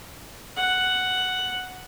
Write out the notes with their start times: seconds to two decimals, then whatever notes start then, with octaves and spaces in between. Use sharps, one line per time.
0.57 F#5